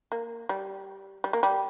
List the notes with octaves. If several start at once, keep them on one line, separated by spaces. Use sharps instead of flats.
A#3
G3
G3
A#3
G3